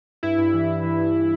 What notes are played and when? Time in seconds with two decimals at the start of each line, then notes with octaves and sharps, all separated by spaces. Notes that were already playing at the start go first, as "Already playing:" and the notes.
0.23 G2 E4
0.38 G2
0.54 E3
0.69 G2
0.83 E3
0.98 G2